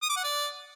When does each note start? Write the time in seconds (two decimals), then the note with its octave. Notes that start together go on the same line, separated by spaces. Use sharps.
0.02 D#6
0.09 D6
0.16 F#5
0.24 D5